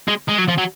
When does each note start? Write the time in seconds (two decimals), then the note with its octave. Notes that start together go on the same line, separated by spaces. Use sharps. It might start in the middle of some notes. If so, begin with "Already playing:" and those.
0.08 G#3
0.29 G#3
0.39 F#3
0.49 F3
0.58 F#3